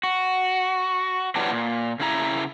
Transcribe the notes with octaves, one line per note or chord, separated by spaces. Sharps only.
F#4
E3 F#3 G3 B3 D4
A#2
C#3 E4 A#5